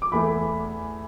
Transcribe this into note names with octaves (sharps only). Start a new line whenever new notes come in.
D6
E2 E3 A3 B5